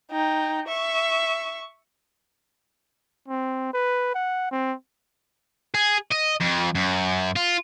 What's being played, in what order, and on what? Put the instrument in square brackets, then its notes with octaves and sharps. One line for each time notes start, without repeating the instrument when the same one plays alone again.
[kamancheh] D#4 G5
E5 C#6
[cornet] C4
B4
F#5
C4
[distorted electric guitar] G#4
D#5
F2
F#2
F4